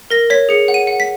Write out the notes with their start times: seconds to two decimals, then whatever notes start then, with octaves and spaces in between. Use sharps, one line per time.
0.10 A#4 A#6
0.30 C#5 B6
0.49 G#4 C#7
0.68 F#5
0.74 D#7
0.87 F#5
1.00 B6